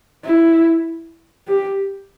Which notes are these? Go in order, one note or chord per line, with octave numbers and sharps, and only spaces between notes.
E4
G4